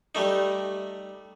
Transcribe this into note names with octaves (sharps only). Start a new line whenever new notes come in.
G3 A3 D#4